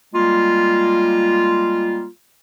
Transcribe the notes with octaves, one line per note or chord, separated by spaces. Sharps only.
G3 G#3 A#3 F4